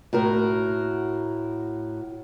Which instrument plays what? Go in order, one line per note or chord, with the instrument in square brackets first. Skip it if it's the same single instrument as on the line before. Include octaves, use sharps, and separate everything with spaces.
[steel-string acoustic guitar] A2 F#4 A#4